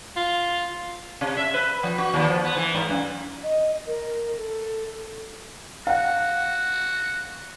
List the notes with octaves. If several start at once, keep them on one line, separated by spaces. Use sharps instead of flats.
F4
C3
E5
B4
F3
F#4
D#2
F3
B3
E3
G#2
F#2
D#5
A#4
A4
F#4 F5 F#5